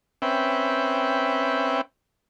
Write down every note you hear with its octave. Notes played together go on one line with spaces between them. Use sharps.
C4 C#4 B4 E5 G5